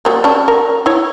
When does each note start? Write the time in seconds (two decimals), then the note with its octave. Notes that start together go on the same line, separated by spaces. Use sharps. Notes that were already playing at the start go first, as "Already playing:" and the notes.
0.05 F#3 G3 A#3
0.24 C#4 D5 A5
0.48 A#4
0.86 E4 C#5